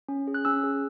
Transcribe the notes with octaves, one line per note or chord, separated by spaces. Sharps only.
C#4
G#4
F#6
C#4 E6
G#4